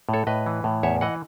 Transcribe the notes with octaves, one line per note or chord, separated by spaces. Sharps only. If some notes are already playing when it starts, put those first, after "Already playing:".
A2 A4 C#5
A2 B4 D#5
E3
A2
E2 C#5 E5
E3 D#5 F#5